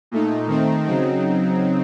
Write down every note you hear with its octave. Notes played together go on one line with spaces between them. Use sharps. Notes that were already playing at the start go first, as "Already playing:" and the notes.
A#2 A3 D#4
D#3 A3 C4 D#4
C#3 F#3 C4 D#4